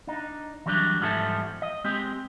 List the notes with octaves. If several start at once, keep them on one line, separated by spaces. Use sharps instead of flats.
D4 D#4
E3 F#3 G3 C4 D4
E2 G#2 F3 G3 A4 E5
D#5
G#3 C4 G4